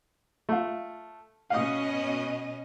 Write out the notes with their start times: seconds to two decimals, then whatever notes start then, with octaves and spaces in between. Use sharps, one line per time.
0.49 A3 F4
1.50 B2 C#4 D#5 F5 D#6